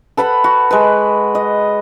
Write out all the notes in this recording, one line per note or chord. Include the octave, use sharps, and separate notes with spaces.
A4 B4 F#5 B5
F#4
G#3 B4
D#5